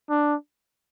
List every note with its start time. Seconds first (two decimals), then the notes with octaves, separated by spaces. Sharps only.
0.10 D4